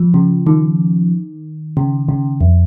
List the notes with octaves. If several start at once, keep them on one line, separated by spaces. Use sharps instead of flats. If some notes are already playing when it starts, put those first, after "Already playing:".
Already playing: F3
C#3
D#3
C#3
C#3
F2